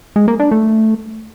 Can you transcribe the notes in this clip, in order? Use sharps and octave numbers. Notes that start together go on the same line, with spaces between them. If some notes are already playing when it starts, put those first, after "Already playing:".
G#3
A#3
D4
A3